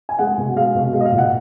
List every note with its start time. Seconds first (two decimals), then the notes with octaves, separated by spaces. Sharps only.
0.09 G#5
0.19 G#3 F#5
0.38 B2
0.56 G#3 F5
0.75 B2
0.93 G#3 F5
1.01 D#5
1.06 F5
1.12 A#2
1.18 F#5